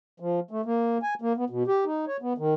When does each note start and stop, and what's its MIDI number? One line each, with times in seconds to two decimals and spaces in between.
0.20 0.40 53
0.51 0.61 57
0.65 0.98 58
1.02 1.14 80
1.22 1.33 58
1.37 1.45 59
1.50 1.63 47
1.67 1.84 67
1.85 2.05 63
2.07 2.17 73
2.22 2.33 59
2.38 2.54 51